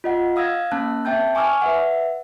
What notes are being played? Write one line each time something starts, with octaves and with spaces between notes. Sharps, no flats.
F4 D#5 F#5
F5 D#6 E6 G#6 A#6
A#3 C#4 A5 F#6
C4 E5 G5 A5 G6
G#5 C#6 D6 E6 F6
B4 E5 F#5